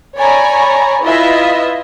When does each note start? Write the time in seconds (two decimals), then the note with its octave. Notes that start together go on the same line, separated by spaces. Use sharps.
0.18 C#5 D5 G#5 A#5 B5 C#6
1.05 E4 F4 B4 D#5 E5